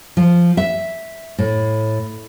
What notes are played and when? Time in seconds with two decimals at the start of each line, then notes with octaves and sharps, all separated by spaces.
0.17 F3
0.57 E5
1.38 A2